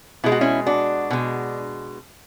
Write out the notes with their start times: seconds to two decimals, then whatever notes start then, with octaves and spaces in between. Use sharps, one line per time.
0.24 B2 G#3 E4
0.32 F#4
0.41 C#4 E4
0.67 D4 F#4
1.11 B2 G#3